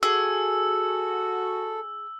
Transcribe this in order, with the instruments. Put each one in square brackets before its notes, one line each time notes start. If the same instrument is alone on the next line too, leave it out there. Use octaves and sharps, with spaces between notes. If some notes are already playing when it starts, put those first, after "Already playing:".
[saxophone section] F#4 [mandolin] G#4 [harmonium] A4 [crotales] E6